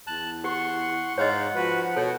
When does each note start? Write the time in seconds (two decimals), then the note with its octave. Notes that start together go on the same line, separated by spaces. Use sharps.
0.07 E2 A5 F#6
0.44 G4 F#5 C6 C#6
1.18 G#2 C#5 D#5 F5 F#5
1.55 F3 F#4 B4
1.96 B2 F#4 A4 C#5